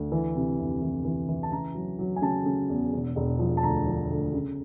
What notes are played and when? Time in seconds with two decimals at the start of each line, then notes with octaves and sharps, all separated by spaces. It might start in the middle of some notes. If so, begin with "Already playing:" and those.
Already playing: D2
0.12 E3
0.36 C3
0.59 F1
0.82 E3
1.05 E3
1.28 E3
1.43 A5
1.52 C#3 A#5
1.75 F#3
1.99 F#3
2.16 G#5
2.22 C#3 A5
2.46 C#3
2.70 E2
2.93 E1
3.16 E1
3.39 F3
3.57 A5
3.63 D2 A#5
3.86 F3
4.10 D2
4.34 C#3